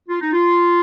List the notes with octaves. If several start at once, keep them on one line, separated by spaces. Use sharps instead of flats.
F4
D#4
F4